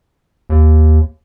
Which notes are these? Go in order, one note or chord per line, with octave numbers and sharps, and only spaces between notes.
D#2